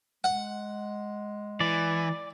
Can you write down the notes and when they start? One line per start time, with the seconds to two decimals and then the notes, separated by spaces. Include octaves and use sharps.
0.24 G#3 F#5
1.60 E3 D5